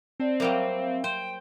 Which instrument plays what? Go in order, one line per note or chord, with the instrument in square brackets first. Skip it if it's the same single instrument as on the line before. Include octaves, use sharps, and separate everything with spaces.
[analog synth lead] C4 [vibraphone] D5 A5
[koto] F#3 G3 A#3 [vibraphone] E5 F5
[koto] C5 [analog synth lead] G5